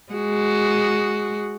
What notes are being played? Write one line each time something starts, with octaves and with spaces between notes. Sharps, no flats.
G#3 F#4